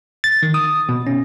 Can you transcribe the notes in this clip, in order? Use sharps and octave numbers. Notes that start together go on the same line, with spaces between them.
A6
D#3
D#6
B2
C#4